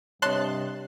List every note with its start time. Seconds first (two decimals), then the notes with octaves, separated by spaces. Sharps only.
0.22 G2 C3 C#5 D#5 A5 C6 F#6